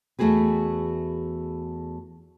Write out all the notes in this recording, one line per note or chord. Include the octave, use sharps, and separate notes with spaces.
E2 A3 D#4 F#4 G#4 B4